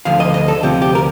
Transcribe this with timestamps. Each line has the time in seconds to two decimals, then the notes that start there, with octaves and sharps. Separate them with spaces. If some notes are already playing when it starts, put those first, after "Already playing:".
0.05 D2 D3 F3 F5
0.20 D#5
0.34 D#5
0.48 A4
0.63 D2 C3 F3 G4
0.82 G4
0.95 A#4